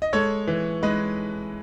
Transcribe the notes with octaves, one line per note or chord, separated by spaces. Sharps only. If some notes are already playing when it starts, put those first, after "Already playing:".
D#5
G#3 A4 C#5
E3
G#3 B4 D#5